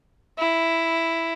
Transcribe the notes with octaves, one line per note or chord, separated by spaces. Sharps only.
E4